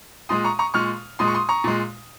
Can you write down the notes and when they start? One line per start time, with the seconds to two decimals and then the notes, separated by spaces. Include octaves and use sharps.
0.29 A#2 G#3 C6 D#6
0.44 A#5 C#6
0.59 A#5 C#6
0.74 A#2 G#3 C#6 F6
1.19 A#2 G#3 C6 D#6
1.28 C#6
1.34 C6 D#6
1.49 A#5 C#6
1.64 A#2 G#3